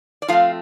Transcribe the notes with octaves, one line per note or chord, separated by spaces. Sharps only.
D5
F3 A3 C4 F4 F5